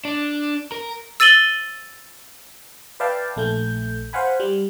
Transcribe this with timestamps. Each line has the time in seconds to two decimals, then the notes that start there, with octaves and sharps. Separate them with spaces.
0.05 D4
0.72 A#4
1.20 E6 A6 D#7 F#7 G7
3.00 B4 D5 E5 F5 G5 A5
3.36 A#1 A3 G6
4.13 C5 F5 F#5 G#5 B5
4.40 G3